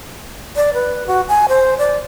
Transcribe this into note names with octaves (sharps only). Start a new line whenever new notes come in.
D5
B4
F#4
G#5
C5
D5